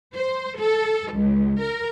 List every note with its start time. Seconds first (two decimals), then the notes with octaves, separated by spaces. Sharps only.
0.15 C5
0.59 A4
1.14 C#2
1.61 A#4